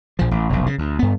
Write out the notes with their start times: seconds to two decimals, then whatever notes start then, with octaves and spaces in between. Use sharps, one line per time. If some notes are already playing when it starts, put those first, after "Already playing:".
0.19 A#1 F3
0.31 A1
0.50 F1 B1
0.66 C#3
0.78 D2
0.99 G2 B3